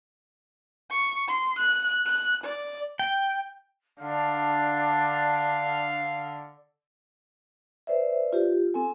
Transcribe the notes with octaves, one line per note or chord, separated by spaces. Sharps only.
C#6
C6
F#6
F#6
D5
G5
D3 D4 F5
B4 C5 D5 E5
F4 G4
C4 A4 G#5